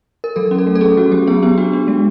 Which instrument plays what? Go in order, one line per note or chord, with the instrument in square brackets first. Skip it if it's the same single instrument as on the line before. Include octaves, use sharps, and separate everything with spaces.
[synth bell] A#4
F#3 A4
C#4
A4
A3
A4
C#4 G#4
F#3 F#4
F#3 G4
B3 G#4
B3 G4
D4 F#4
D4
G#3